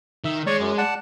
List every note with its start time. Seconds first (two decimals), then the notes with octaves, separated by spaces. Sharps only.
0.24 D#3 E5
0.47 G#3 C#5 D5 C#6
0.59 F#2
0.78 D5 F#5 A5